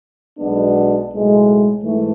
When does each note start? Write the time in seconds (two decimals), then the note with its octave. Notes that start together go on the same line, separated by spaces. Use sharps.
0.38 B1 B2 G#3 B3 D4
1.10 B1 A2 G#3
1.81 G#2 E3 A3